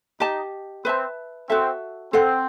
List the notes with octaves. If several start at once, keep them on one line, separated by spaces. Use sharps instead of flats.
D#4 G4 D#5 A5
C4 B4 E5 A5
C4 F#4 A4 E5
C4 A4 C5 F#5